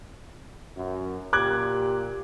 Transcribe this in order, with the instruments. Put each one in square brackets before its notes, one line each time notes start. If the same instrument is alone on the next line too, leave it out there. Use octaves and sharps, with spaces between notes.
[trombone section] F#2
[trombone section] A#2 G4 [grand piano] D6 F#6 G#6